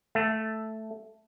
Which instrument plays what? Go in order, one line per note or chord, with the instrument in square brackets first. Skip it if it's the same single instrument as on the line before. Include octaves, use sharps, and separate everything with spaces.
[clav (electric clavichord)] A3